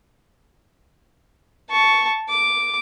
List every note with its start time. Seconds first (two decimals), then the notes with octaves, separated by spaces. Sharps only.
1.70 A5 C#6
2.29 D6